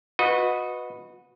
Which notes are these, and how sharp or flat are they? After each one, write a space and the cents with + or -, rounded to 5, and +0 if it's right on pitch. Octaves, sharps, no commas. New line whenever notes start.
F#4 -25 B4 +0 D#5 +0